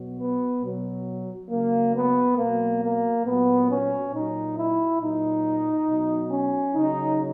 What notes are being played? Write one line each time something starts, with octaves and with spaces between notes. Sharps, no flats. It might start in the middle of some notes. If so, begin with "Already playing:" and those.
Already playing: B2 F#3
B3
B2 F#3
C#3 F#3 A#3
B3
B2 F#3 A#3
A#3
A#2 F#3 B3
C#4
A#2 F#3 D#4
E4
A#2 F#3 D#4
B2 F#3
C#4
C#3 F#3 D#4